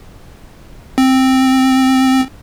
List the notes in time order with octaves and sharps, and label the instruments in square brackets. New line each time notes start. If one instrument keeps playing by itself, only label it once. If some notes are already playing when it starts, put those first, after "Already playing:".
[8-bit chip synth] C4